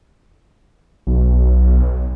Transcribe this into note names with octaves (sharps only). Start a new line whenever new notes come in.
B1